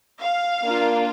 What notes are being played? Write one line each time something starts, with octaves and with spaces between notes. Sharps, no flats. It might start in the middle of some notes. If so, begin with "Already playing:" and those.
F5
A#3 D4 F4